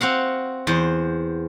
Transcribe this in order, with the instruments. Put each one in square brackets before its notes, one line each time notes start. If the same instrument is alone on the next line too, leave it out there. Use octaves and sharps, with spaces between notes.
[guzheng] C4 F#4 F5 F#5
E2 C5